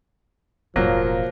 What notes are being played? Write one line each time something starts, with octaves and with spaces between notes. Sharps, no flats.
E1 A1 F3 F#3 A#3